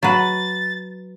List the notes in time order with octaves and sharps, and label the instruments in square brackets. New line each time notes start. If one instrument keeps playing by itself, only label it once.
[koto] F#3 B4 [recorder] A6